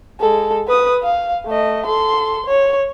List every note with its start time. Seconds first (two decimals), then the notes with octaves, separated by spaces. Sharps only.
0.20 G#3 A4
0.68 B4 D#6
1.03 F5
1.47 A3 D#5
1.86 A4 C6
2.46 C#5